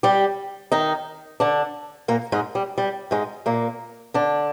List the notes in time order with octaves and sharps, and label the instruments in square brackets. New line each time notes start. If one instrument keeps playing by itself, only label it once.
[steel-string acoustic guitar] G3 G4
D#3 D#4
D3 D4
A#2 A#3
G#2 G#3
G3
G3
G#2 G#3
A#2 A#3
D3 D4